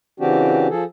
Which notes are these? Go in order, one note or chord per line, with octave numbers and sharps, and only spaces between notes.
C#3 E3 C4 D4 F#4 G4
F3 G#4 A4